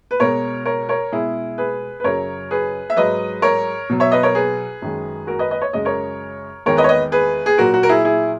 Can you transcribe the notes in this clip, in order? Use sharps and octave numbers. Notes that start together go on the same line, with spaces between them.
B4
B2 G#3 A#4 C#5
A#4 C#5
A#4 C#5
B2 G#3 E4 G#4
G#4 B4
B4
F#2 C#3 F#3 A#4 C#5
G#4 B4
E5
G#2 F#3 B4 D#5
A#4 C#5
B2 F#3
C#5 E5
B4 D#5
A#4 C#5
G#4 B4
F#2 D#3 G#3
F#4 A#4
B4 D#5
B4 D#5
C#5
F#2 C#3 G#3 D#5
A#4 C#5
E2 D#3 G#3 A#4 C#5
B4 D#5
C#5
B4 D#5
G#4 B4
G#4
A#2 F#3 F#4 A#4
F#4
A#4
E4 G#4
E4 G#4